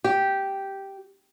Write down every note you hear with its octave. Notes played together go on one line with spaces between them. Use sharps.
G4